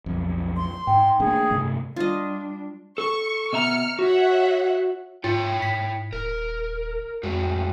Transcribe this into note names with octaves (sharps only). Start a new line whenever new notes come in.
B1 F2
C6
G#2 G5
A3 A#3 D4 G#4
G2 C3 A3
G3 D4 F4 D#5
A4 C#6
B2 E5 A#5 F6 C#7
F#4 C#5 E5 F#5
G#2 E4 F4 C#5 G5
G#2 B6
D#1 A#4
F2 A2 G#3 F#4